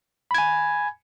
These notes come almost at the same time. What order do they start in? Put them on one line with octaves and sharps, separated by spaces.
B5 G#6 G#5